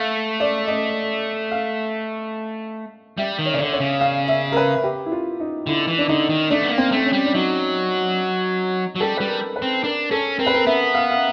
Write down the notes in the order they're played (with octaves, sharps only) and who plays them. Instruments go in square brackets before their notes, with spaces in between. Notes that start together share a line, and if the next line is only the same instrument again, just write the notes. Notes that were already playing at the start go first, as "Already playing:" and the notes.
Already playing: [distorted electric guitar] A3 [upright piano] F5
[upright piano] D5
D#5
F5
[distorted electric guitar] G3 [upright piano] E5
[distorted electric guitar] D#3
[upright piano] C#5
[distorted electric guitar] C#3 [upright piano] D5
[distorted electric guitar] D3 [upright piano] C#5
[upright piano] C#5
[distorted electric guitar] C#3
[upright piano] F5
E5
A#4
B4
G4
E4
F4
D#4
[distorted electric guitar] D3 [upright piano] E4
[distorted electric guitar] E3
[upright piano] D4
[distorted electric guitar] D3 [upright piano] D#4
[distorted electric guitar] D#3
[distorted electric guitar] A3 [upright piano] D4
[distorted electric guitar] B3
A#3
[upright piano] C4
[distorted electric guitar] A3 [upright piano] C4
[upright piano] C#4
[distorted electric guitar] G3
[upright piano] D4
[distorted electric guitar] F#3 [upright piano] D#4
[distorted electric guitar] F#3
[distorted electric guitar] G3 [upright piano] A4
[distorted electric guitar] G3 [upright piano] B4
[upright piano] A#4
B4
[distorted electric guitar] C4
[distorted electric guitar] D4 [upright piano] A#4
[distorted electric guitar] C#4 [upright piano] A4
[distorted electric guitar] C4 [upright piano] A#4
[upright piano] B4
A#4
[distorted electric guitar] B3 [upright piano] E5
[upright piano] F5
F5